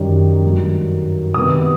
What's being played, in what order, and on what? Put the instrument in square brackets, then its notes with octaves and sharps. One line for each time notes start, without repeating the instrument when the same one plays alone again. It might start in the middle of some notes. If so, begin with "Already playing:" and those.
Already playing: [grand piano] F#2 D#3 G3
G2 D#3 F#3 A3
C3 D#3 G3 B3 D#6